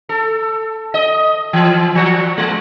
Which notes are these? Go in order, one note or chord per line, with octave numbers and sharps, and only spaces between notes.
A4
D#5
E3
F3
G#3